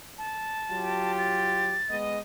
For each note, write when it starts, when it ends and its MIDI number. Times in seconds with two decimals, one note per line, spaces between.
0.18 1.12 81
0.69 1.76 54
0.69 1.76 65
0.69 1.76 67
1.18 1.96 93
1.88 2.17 56
1.88 2.17 59
1.88 2.17 75